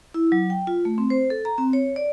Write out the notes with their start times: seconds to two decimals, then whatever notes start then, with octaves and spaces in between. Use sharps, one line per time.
0.14 E4
0.32 F#3
0.50 G5
0.67 F4
0.85 A3
0.98 C4
1.10 C5
1.30 A4
1.45 A#5
1.58 C4
1.73 C#5
1.96 D5